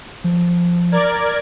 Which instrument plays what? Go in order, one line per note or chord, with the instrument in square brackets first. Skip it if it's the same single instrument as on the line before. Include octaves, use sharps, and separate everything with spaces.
[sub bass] F3
[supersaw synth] A#4 D5 G#6